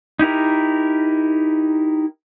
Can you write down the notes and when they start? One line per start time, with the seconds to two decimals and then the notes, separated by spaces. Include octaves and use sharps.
0.19 D#4 E4 G4 A#4